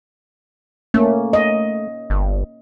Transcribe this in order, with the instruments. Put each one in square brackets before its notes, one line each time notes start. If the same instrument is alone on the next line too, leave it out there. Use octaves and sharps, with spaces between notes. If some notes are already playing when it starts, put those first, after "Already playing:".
[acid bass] A3 [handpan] A#3 C#4
[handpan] D#5
[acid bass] G1